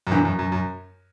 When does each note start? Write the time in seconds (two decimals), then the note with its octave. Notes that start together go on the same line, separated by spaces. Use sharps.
0.07 F#2
0.11 E2 G2
0.25 F#2
0.39 F#2
0.52 F#2